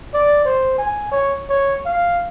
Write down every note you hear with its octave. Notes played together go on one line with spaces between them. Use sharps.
D5
C5
G#5
C#5
C#5
F5